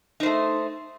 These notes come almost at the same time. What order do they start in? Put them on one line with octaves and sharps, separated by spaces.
D#4 C5 A3